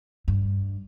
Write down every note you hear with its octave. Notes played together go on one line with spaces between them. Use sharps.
G2